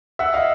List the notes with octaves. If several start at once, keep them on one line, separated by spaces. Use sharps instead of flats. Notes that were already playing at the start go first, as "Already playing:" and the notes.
E5 F#5
D#5 F5